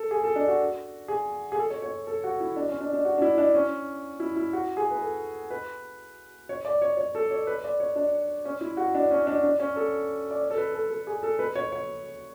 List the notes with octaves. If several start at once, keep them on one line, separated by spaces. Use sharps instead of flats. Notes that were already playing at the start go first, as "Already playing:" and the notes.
Already playing: A4
G#4
A4
D4
F#4
G#4
G#4
A4
C#5
C#5
A4
F#4
E4
D4
C#4
D4
D4
F#4
D4
E4
D4
C#4
E4
E4
F#4
G#4
B4
A4
B4
C#5
D5
C#5
C#5
A4
C#5
B4
D5
C#5
D4
C#4
E4
F#4
D4
C#4
D4
D4
C#4
A4
D5
C#5
A4
B4
A4
A4
G#4
A4
B4
C#5
C#5